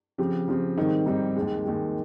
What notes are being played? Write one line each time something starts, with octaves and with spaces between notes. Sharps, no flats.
C#3 F3 C4 G4
C#3 F3 C4 G4
G#2 D#3 G3 C4 D#4
G#2 D#3 G3 C4 D#4
D#2 D#3 G#3
D#2 D#3 G#3